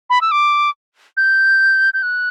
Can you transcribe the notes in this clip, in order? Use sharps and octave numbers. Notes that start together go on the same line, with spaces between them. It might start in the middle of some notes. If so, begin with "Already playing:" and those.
B5
E6
D6
G6
G6
F#6